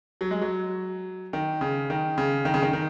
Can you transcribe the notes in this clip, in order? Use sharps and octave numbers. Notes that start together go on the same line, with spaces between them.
F#3
G#3
F#3
D#3
C#3
D#3
C#3
D#3
C#3
D#3
D#3